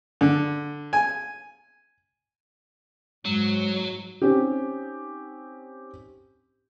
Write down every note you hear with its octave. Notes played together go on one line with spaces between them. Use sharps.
D3
G#5
G#2 F#3
C4 C#4 D#4 G4